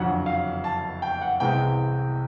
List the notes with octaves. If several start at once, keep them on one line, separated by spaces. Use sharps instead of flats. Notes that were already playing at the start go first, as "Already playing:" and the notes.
Already playing: F#1 F2 D3 F#3 F#5
F5
A5
G5
F#5
C2 C3 E3 G#3 G5